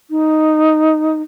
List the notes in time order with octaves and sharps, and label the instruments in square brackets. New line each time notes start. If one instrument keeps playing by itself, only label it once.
[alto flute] D#4